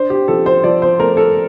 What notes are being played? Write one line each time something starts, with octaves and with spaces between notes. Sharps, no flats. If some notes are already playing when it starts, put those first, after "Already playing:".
Already playing: D4 C5
G4
F3 A4
C5
F3 D5
C5
A3 A#4
A4